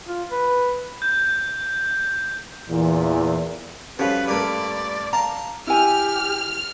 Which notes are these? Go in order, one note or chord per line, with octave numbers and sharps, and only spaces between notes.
F4
B4
G6
E2 A#2 E3
F3 G3 C#4 F#4 A4 B4 C#5 F5
G2 A3 A#3 A#4 D5 B5
F5 A5 A#5
E4 G4 G#5 F6